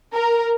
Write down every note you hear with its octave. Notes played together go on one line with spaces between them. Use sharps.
A#4